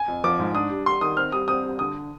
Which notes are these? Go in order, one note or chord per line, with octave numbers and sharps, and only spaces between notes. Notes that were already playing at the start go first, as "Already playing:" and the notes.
Already playing: G#5
F2
F3 D6
G#2
D4 D#6
G3
G3 C6
D#3 D#6
C4 F6
G3 D#6
C4 D#6
G3
D3 D#6